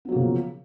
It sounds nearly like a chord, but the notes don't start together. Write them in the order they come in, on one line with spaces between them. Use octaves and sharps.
B3 F#3 A#3 C#3 F3